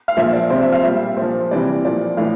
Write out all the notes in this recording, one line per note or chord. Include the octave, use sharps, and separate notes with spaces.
F5
A#2 F3 E5
D5
C3 F3 C5
E5
F5
A#2 G3 E5
A#2 C5
F3
C3 E3 G3 D5
A#2 F3 D5
A2 E3 F5